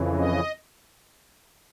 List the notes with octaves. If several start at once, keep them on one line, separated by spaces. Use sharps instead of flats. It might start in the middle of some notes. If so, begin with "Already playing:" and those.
Already playing: F2 C#3 E3
D#5